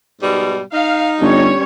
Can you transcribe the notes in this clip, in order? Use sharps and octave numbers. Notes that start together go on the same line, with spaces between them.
G#2 B2 G3
D#4 F5
G1 G3 C#4 C#5